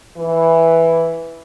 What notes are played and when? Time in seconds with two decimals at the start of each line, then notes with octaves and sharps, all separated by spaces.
0.16 E3